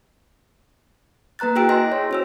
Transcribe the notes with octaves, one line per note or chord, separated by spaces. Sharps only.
A#3 B4 A#5 F#6 A6
E4 F#4 G#4 G5 E6 D7
E4 F#4 D#5 G#5 C6 A#6
C#5
C#4 C5 E6